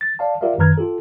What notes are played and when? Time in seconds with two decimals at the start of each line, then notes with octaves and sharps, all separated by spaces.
0.01 A6
0.19 D5 F5 A5
0.41 F4 G4 A#4 D5 E5 F5
0.58 F#2 D#3 B4 A#5 F6 G#6
0.78 F4 G4 A4